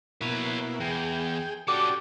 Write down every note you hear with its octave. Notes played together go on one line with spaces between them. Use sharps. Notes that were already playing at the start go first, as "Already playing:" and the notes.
B2 A#3 E4 B4 C#5
E2 G#4 G5
C#4 F#4 G4 A4 D5 D6